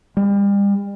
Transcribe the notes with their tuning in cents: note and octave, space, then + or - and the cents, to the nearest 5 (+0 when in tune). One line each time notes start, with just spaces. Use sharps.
G3 +40